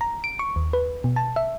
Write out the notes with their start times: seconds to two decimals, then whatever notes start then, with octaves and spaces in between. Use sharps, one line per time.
0.01 A#5
0.24 D7
0.39 C#6
0.56 D#2
0.73 B4
1.04 B2
1.16 A5
1.36 E5